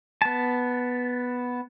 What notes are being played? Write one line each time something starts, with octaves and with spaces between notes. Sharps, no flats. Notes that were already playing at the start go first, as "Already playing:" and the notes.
B3 A5